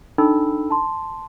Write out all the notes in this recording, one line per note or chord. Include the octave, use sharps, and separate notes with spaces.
D4 D#4 A4 G5 B5 E6
A5 C6